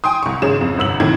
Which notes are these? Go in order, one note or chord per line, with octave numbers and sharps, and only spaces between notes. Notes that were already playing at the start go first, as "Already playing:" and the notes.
G5 G#5 C6 D#6
C2 C#6
G#1 C#3 C#4 G#4 E7
F2
G1 C2 E6 F#7
F2 A2 C3 D#3 G#6